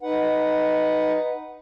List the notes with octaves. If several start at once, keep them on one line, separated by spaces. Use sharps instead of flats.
D#4 B4 F#5